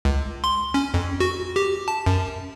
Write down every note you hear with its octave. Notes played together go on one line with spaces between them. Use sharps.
C#2
C6
C#4
F2
F#4
G4
A5
F#2